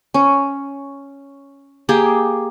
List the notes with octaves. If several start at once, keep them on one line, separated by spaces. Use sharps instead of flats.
C#4
A#3 G4 G#4